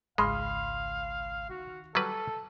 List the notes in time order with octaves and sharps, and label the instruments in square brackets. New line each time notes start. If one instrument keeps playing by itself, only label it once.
[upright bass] G#1 C#2 [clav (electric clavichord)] G#3 [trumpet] F5 [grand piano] B5 C6 F6
[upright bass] D#3 [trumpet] F#4
[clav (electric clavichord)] F#3 G3 B4 [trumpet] A4